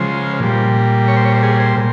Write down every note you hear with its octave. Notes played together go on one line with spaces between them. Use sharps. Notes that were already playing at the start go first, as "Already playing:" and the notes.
Already playing: C#3 F3 G#3 C5
A#2 G3
C#5
C5
C#5
C5
G#4
C5
A#2